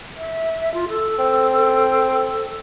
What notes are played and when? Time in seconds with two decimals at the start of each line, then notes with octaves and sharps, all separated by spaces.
0.17 E5
0.74 F4
0.89 A4
1.19 C4